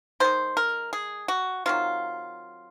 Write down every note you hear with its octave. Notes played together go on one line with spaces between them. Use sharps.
D#3 G#3 C5
A#4
G#4
F#4
C3 D#3 F#3 F4